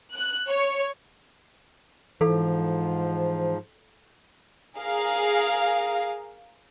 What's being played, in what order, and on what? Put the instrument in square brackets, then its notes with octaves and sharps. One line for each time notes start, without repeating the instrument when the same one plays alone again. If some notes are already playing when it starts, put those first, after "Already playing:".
[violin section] F#6
C#5
[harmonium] G#2 F3 [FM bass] E3 [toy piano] A4 F5
[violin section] G#4 A#4 F5